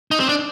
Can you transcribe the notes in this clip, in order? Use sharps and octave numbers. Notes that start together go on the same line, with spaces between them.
D#4
C4
D4